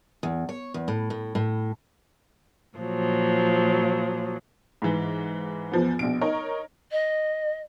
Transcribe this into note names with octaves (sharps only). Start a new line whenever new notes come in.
E2
C#5
E2
A2
A2
A2
A#2 F3 F#3
G#2 E3
E2 F3 B3
A#1 B2 D7
D#4 A#4 C#5
D#5